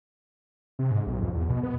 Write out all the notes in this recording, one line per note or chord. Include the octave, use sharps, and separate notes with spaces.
C3
G#2
B1
F2
E2
B2
B3